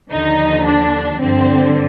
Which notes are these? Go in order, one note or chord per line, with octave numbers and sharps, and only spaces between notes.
D#2 D3 F3 D#4
D4
G2 D3 F3 C4